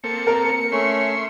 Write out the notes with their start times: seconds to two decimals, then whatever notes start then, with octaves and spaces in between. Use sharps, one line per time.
0.04 A#3 C4 A4 C#7
0.27 A#4
0.72 A3 C#4 E5 C6